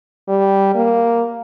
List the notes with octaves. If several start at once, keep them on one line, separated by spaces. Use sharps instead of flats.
G3
A#3